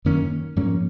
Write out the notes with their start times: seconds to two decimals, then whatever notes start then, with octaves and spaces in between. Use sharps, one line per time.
0.05 F#2 D#3 A#3 C#4
0.56 G#2 F3 A#3 C#4